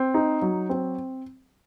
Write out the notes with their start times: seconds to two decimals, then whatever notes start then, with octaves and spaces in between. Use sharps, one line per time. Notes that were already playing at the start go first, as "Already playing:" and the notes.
Already playing: C4
0.14 D#4
0.42 F#3
0.69 C4